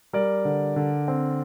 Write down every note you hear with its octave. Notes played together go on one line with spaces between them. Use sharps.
G3 A#4 D5
D3
D3
C4